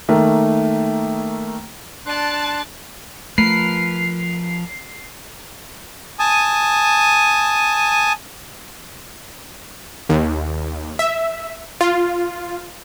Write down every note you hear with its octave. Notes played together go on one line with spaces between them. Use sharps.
D#3 A3 A#3
D4 D5 A5 C6 F#6
F3 A3 A#4 B4 C7
G#5 A5 D#6
D#2
E5
F4